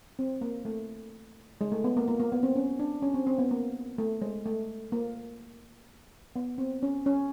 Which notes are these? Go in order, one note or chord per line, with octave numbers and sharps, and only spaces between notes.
C4
A#3
A3
G#3
A3
B3
A#3
A#3
A#3
B3
C4
C#4
D4
C#4
C4
C4
B3
A#3
A3
G#3
A3
A#3
B3
C4
C#4
C#4